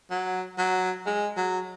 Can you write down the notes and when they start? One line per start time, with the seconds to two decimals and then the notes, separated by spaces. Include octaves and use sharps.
0.10 F#3
0.58 F#3
1.06 G#3
1.37 F#3